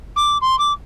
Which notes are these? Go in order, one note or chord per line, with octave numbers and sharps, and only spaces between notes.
D6
C6
D6